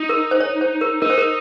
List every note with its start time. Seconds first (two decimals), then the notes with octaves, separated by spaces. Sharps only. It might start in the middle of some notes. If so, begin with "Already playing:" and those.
Already playing: D#4
0.09 A#4
0.31 C5
0.40 C#5
0.61 C5
0.81 A#4
1.02 D#4 A#4
1.10 C5
1.18 A#4